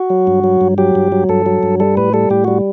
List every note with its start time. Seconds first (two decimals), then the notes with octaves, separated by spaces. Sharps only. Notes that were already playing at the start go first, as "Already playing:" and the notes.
Already playing: F#4
0.10 F#3
0.27 G2
0.44 F#3
0.61 G2
0.78 F#3 G4
0.95 G2
1.12 F#3
1.29 G2 A4
1.46 F#3
1.63 G2
1.80 G3 A4
1.97 A2 B4
2.14 G3 A4
2.30 A2 G4
2.45 G3 F#4